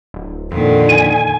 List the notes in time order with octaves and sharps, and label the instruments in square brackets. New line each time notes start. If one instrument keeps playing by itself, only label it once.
[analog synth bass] D1
[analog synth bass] F2 [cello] A#2 D#3 [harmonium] D3
[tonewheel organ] G#5